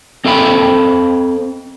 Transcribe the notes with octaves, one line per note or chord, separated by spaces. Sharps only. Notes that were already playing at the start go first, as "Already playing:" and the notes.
C4 A4 F5 G5 B5